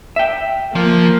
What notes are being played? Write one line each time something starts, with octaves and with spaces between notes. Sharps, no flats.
E5 G5
F3 A#3